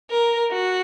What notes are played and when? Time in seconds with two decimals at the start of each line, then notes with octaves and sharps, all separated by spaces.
0.11 A#4
0.52 F#4